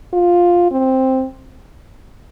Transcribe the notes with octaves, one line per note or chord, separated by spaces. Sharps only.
F4
C4